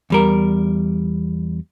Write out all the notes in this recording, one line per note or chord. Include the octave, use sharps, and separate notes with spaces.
E2 G3 A#4